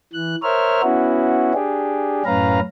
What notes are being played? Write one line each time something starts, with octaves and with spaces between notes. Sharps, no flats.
E3 F#6
A#4 C5 C#5 E5 F6
B3 C#4 E4 F#4
D4 G4 G#4
F#2 A2 C#4 B4 F5 A#5